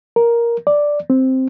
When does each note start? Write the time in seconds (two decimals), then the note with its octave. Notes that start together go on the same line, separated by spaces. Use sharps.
0.16 A#4
0.67 D5
1.10 C4